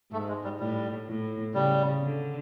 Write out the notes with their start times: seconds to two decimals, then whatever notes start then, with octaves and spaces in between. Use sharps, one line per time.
0.12 G#2 A3
0.28 G#3
0.44 G3
0.60 A2 G3
1.08 A2
1.54 C#3 G3
2.02 D3